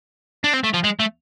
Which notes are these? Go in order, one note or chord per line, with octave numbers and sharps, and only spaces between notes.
D4
C4
A3
F3
G#3
A3